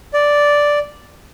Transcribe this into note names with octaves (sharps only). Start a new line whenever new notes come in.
D5